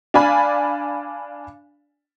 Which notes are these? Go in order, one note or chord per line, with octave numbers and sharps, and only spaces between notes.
D4 D5 F5 G#5 B5